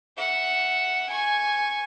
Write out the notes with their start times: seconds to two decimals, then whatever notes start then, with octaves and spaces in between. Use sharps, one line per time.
0.17 E5 F#5
1.10 G#5 C#6